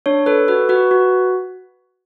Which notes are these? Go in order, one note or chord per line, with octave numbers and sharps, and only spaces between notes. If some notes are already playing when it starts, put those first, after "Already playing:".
D4 C#5
A4 B4
F#4 B4
F#4 B4
F#4